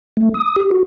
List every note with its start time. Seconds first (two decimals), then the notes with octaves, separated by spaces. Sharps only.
0.17 A3
0.34 D#6
0.56 G4
0.71 F#4